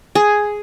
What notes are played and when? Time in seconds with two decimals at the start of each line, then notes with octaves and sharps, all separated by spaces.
0.15 G#4